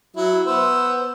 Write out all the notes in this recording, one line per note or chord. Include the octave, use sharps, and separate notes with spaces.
F#3 E4
B3 C5 E6